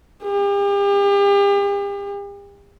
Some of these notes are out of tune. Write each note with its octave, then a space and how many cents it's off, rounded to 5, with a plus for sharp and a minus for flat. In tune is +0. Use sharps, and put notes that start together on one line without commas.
G4 +40